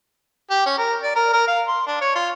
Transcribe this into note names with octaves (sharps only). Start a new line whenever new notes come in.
G4
C#4
A#4
D5
A#4
A#4
F5
C6
D4
C#5
F4